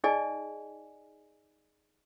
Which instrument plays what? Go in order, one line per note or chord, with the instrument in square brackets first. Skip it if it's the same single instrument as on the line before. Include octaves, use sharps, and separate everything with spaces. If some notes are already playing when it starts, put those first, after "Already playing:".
[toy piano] D#4 G#4 D5 D#5 G#5